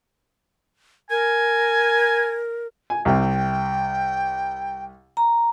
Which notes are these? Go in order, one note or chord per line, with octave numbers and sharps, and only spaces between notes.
A#4 G#5
G#5
C2 C3 G5
A#5